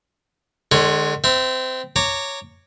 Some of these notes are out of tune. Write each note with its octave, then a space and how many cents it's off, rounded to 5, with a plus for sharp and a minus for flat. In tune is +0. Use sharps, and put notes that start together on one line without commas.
D3 +40 G#3 +0 C#5 +0
C4 -20 E5 +0
C#5 +0 A#5 -25 D6 +0